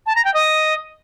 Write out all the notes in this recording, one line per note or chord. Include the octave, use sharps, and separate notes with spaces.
A5
A#5
G5
D#5